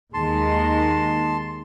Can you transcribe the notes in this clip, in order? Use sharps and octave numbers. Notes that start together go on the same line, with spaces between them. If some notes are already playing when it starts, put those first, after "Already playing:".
D#2 D#3 G#3 A5 C6